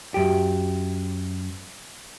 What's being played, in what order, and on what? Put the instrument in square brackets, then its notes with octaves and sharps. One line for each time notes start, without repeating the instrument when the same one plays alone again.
[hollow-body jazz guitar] F#2 G4